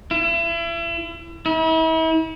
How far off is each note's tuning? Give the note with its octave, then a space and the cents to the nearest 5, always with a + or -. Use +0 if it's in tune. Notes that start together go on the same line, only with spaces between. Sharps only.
E4 +35
E4 -40